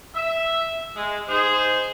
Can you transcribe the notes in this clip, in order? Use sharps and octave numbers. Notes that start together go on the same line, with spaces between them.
E5
G#3
D#4 G#4 C5